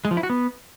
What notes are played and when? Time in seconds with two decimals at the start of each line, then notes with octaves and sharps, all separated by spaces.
0.05 G#3
0.11 F3
0.17 E4
0.23 F#4
0.30 B3